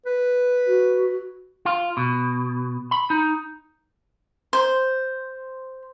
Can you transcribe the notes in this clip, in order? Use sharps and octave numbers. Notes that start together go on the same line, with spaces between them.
B4
F#4
F4
B2
B5
D#4
C5